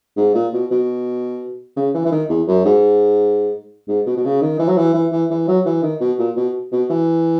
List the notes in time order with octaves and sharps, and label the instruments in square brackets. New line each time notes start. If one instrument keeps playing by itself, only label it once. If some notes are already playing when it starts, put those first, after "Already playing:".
[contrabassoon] G#2
A#2
B2
B2
C#3
E3
E3
D#3
E2
F#2
G#2
G#2
B2
B2
C#3
D#3
E3
F#3
E3
E3
E3
E3
F#3
E3
D#3
B2
A#2
B2
B2
E3